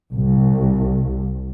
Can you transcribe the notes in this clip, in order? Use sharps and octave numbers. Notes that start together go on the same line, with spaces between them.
C2